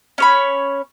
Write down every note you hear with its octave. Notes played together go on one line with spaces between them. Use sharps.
C#4 C#5 B5